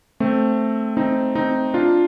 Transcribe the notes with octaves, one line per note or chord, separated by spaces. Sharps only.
A3 C4
C4 D#4
C4 D#4
D4 F4